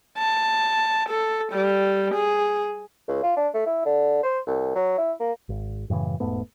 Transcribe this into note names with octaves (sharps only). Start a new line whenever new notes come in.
A5
A4
G3
G#4
C#2
F4
D4
A3
E4
D3
C5
C2
F#3
E4
A#3
G#1
F#2 A2 C#3 E3
E1 G#2 A3 B3